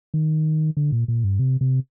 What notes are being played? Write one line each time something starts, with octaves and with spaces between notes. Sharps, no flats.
D#3
D3
A#2
A#2
G2
C3
C3